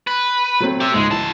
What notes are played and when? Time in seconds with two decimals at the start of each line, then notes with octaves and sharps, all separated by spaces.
0.07 B4
0.60 F#3 A3 C4
0.80 G4 E5
0.94 C#2 G#2 G#3
1.10 F#2 E3 A5